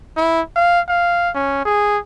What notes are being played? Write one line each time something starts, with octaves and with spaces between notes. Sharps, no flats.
E4
F5
F5
C#4
G#4